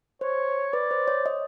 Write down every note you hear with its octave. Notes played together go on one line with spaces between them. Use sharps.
C5 C#5
B4 D5
C5
C#5
D#5